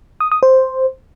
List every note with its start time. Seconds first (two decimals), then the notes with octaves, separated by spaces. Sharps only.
0.20 D#6
0.32 D#6
0.43 C5